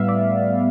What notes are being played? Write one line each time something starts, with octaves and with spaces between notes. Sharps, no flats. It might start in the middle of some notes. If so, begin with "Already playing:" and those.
Already playing: A2 G3 B3 E5 F5
D5